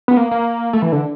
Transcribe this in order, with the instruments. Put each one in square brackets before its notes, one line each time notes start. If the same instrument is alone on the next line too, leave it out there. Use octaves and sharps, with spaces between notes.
[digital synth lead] B3
A#3
A#3
A3
E3
D3